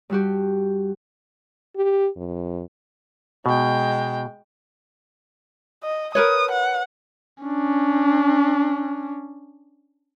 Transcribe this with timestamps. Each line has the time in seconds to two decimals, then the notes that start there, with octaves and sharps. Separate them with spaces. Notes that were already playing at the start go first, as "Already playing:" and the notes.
0.10 G2 G3 F#4 G4
1.76 G4
2.17 F2
3.46 B2 G#3 G5
5.84 D#5
6.15 A#4 B4 C#5 D#6
6.51 F#5
7.44 C#4 D4